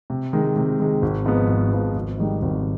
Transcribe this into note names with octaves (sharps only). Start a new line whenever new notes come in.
C3
D#3 G#3
C3
D#3 G#3
G#1
G#2 F3 B3
G#1
G#2 F3 B3
G#1
G#2 D#3 G3
G#1